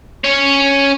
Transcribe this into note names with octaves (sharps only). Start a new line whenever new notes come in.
C#4 C#5